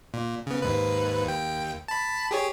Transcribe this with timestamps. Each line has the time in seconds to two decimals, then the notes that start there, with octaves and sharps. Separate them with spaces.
0.14 A#2
0.47 C#3 B3
0.62 D#2 G#2 B4
1.25 D#2 G5
1.88 A5 B5
2.31 G4 G#4 C#5